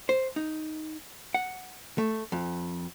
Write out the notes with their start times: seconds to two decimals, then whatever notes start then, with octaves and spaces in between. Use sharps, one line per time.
0.09 C5
0.36 D#4
1.34 F#5
1.98 A3
2.32 F2